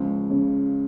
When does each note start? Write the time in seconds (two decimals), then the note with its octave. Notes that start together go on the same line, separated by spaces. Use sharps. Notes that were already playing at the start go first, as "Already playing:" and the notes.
Already playing: C#2 F3
0.30 C#3